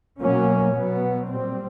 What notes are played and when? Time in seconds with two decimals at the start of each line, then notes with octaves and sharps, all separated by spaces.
0.21 B2 F#3 A#3 C#4
0.74 B2 F#3 B3
1.28 A#2 G3 C4